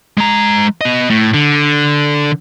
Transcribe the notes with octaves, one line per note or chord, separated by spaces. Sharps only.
G#3 A#5
B3 D#5
A2
D3